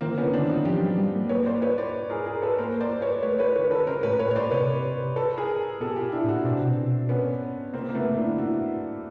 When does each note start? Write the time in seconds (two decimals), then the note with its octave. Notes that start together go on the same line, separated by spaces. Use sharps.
0.01 D#3 A#3 C4
0.18 B3 C#4
0.23 D3
0.33 C4 D4
0.44 D#3
0.49 D#4 F4
0.65 F3 F4 G4
0.82 F#3
0.97 G3
1.14 A#3
1.29 B4 C#5
1.46 C5 D5
1.62 B4 C#5
1.78 C5 D5
2.10 G#4 A#4
2.26 G#4 A#4
2.42 A4 B4
2.58 A#3 A#4 C5
2.80 C5 D5
3.01 B4 C#5
3.23 A3 B4 C#5
3.39 B4 C#5
3.56 B4 C#5
3.58 D#3
3.67 D3
3.71 A4 B4
3.87 C#3 A#4 C5
4.03 A2 B4 C#5
4.19 A2 B4 C#5
4.31 A2 C#5
4.36 A#2 C5 D5
4.51 C3 B4 C#5
5.16 A4 B4
5.37 G#4 A#4
5.80 B2 G4 A4
5.96 F4 G4
6.12 D4 E4
6.24 A#2
6.29 E4 F#4
6.44 B2 C4 D4
6.57 C3
6.70 B2
7.09 B3 C#4
7.73 C3 A#3 C4
7.89 A#3
7.94 C#3 A3 B3
8.16 D3 D4 E4
8.38 C#3 E4 F#4